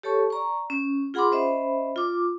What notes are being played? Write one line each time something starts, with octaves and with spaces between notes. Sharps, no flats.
G4 A4 C#5 A5 C#6
D5 A#5 C#6
C#4
F4 G#4 F#5 B5 C6 D6
C#4 C5 D#5 E5 B5
F4 D6